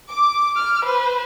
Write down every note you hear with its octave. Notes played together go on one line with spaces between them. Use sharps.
D6
F6
B4 C5